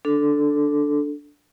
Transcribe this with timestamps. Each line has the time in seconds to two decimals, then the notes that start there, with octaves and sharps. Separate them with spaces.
0.05 D4 A4